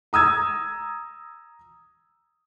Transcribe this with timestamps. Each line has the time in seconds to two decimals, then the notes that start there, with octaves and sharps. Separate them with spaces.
0.13 A#5 D#6 E6 G#6